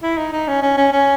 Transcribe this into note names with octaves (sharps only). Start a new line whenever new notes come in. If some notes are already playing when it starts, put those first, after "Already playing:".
E4
D#4
D#4
C#4
C#4
C#4
C#4